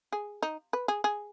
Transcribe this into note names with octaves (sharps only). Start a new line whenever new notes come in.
G#4
D#4
B4
G#4
G#4